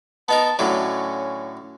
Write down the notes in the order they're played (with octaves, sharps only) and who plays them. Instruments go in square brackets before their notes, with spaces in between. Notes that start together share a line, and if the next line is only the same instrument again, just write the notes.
[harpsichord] B3 D#4 A#4 [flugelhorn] A5
[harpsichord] A2 D3 F#3 [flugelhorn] C#4